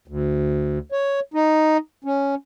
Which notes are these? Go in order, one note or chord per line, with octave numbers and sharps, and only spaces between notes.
D2
C#5
D#4
C#4